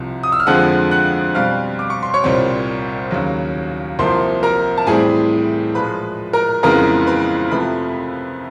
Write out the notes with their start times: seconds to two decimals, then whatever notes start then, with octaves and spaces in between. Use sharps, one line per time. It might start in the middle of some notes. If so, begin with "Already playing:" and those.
Already playing: C2 C3 F3
0.23 D#6
0.32 E6
0.40 F6
0.47 F2 D3 F3 G#3 F#5 F#6
0.91 F#5 F#6
1.35 B2 G3 C4 F5 F6
1.79 D6
1.90 C#6
2.03 C6
2.14 C#5 C#6
2.24 C2 A#2 G3 C4
3.11 D#2 C#3 F#3
3.99 C2 C3 F3 A#3 C5 C6
4.43 A#4 A#5
4.78 A5
4.87 A2 E3 G3 C4 G#4 G#5
5.75 A#2 F3 G#3 B4 B5
6.33 A#4 A#5
6.63 F2 C#3 E3 G#3 B3 A#4 A#5
7.07 B4 B5
7.51 F2 C3 F3 A3 B4 B5